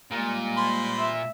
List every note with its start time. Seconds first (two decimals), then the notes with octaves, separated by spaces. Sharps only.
0.11 A#2 G3 G#3 A#3
0.57 C5 B5 C6
0.98 E5